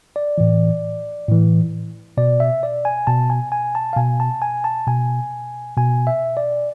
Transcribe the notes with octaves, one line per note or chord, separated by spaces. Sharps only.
D5
A2 E3
A2 E3
B2 D5
E5
D5
G#5
B2 A5
G#5
G#5
A5
F5
B2 G#5
A5
G#5
A5
B2 G#5
B2 G#5
E5
D5